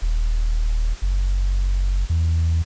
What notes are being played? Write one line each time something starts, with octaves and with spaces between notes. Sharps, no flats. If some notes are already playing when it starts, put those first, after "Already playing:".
D#1
F#1
E2